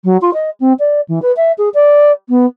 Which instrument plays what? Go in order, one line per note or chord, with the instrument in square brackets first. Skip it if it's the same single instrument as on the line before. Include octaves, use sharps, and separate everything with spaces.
[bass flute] F#3
F4
D#5
C4
D5
E3
B4
E5
G#4
D5
B3